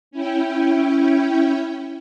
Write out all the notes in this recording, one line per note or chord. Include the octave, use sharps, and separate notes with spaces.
C#4 E4 G5